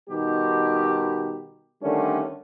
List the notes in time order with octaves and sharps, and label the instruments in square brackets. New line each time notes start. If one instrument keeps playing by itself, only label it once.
[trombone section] B2 D#3 G3 D#4 G4
D3 D#3 G3 A3 C#4 D4